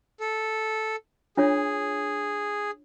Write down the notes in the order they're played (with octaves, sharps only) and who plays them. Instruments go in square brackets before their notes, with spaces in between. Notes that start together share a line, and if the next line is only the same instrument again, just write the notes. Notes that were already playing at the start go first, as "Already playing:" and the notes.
[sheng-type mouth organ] A4
[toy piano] D4 F4 C#5 [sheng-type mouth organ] G#4